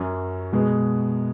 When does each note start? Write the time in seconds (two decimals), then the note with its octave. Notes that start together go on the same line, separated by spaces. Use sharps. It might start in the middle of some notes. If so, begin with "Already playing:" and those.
Already playing: F#2 F#3 C#4
0.53 B2 G#3 B3 G#4